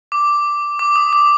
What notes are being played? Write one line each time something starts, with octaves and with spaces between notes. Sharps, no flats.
D6
D6
D#6
D6